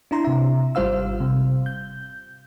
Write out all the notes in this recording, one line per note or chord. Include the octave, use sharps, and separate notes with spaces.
D4 E4 A#5 C6
C3 E5
G#1 G3 F4 C5 F5 E6
C3
G6